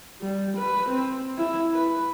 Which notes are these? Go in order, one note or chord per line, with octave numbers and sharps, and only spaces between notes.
G3
B4
C4
E4
B4